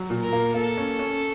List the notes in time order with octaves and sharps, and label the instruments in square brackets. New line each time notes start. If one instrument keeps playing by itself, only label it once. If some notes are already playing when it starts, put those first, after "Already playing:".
Already playing: [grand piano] F#3
A#2
[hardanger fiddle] A#4
[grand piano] A#3
[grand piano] A#3 [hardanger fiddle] A4
[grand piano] C#4
C#4